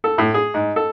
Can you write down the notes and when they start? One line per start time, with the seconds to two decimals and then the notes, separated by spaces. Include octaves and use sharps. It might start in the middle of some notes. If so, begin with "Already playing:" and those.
0.04 A4
0.18 A2
0.34 G#4
0.54 G#2
0.76 A4